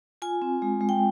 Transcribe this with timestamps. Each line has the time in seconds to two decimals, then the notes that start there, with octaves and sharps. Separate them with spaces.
0.22 F4 G#5
0.42 C4
0.62 G#3
0.81 G#3
0.89 G5